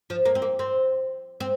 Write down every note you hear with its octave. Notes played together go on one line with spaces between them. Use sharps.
F3
A#3
C4
A#3
C4
C4